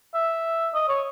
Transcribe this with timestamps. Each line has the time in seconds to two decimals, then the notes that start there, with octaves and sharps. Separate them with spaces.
0.14 E5
0.74 D#5
0.89 C#5